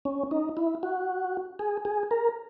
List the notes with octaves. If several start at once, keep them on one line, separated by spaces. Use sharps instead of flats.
C#4
D#4
E4
F#4
G#4
G#4
A#4